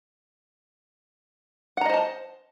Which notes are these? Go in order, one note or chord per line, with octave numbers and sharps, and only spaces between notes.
C5 D#5 F#5 A5 A#5